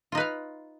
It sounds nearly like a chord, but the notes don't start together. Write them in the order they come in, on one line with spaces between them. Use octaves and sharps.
F4 D#4 B4 F5